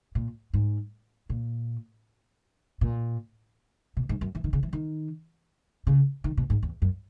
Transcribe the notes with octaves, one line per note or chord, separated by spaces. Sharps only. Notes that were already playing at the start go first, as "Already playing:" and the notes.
A#2
G#2
A#2
A#2
B2
G#2
F#2
E3
D#3
C#3
E3
D#3
C#3
D#3
B2
G#2
E2
F#2